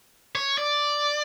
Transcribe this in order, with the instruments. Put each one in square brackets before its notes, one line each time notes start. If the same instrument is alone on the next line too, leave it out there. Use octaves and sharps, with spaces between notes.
[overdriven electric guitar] C#5
D5